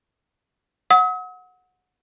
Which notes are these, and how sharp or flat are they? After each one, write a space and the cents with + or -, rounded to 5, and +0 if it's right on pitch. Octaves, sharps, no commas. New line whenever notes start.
F#5 -15 D#6 +45